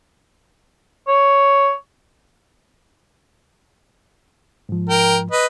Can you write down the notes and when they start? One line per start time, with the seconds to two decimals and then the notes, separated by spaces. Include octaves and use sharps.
1.08 C#5
4.69 G#2 F3
4.90 A#4 G5
5.31 B4 D#5